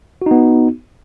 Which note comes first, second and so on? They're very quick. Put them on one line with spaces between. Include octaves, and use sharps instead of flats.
F#4 D#4 B3